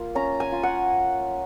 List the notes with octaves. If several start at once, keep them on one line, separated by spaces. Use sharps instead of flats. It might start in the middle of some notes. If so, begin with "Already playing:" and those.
Already playing: A#3 F4
C#4 A#5
G#5
F4
F#5